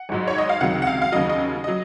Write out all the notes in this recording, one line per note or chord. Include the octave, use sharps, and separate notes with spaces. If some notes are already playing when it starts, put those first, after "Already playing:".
Already playing: F#5
G#1 G#2 F#3
C#5
D#5
F5
C#2 C3 D#3 F#3 F#5
F#5
F5
F5
D#2 C#3 F#3 D#5
D#5
F#3 D#5